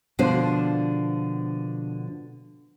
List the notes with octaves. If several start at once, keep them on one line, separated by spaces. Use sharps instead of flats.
B2 D3 F3 A#3 D4 C5